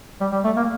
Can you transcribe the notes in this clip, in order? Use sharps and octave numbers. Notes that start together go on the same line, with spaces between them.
G3
G3
A3
A#3